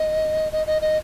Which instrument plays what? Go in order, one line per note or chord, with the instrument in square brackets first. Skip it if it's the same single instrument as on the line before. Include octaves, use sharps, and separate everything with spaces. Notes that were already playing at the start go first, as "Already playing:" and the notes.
Already playing: [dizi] D#5
D#5
D#5
D#5